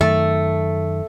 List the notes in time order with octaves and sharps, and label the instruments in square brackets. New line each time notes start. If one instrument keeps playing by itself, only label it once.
[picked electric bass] F#2 D#3 [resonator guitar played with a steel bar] A3